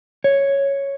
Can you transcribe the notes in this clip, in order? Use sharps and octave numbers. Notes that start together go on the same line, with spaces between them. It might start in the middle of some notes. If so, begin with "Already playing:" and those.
C#5